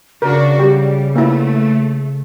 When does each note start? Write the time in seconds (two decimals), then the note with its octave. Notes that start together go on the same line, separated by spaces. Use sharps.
0.22 C#3 D4 F#4 A#4
0.59 G3 G4
1.16 A3 A#3 E4